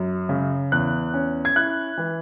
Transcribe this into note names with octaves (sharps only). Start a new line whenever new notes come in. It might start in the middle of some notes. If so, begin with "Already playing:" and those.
Already playing: F#2
C#3
E2 F#6
C#4
G#6
E4 F#6
E3